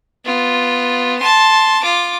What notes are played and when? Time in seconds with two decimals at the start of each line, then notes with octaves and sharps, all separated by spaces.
0.25 B3 F4
1.19 A5 C6
1.83 F4 D6